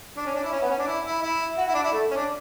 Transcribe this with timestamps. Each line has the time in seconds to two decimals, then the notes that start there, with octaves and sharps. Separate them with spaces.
0.17 D4
0.26 C#4
0.35 D4
0.43 E4
0.51 C#4
0.61 B3
0.70 C#4
0.79 D4
0.87 E4
1.05 E4
1.22 E4
1.57 F#4
1.68 E4
1.74 D4
1.83 E4
1.92 A3
2.11 C#4
2.16 D4